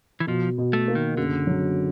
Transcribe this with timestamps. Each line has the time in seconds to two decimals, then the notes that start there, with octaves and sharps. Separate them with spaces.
0.20 E3
0.27 B2 F3
0.58 B2
0.73 A3
0.88 A#3
0.95 D#3
1.17 F#1 D3
1.47 F#3